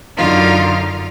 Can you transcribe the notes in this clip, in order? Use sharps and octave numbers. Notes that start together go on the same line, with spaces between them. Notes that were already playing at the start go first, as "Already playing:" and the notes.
F#2 D3 D#4 F4 F5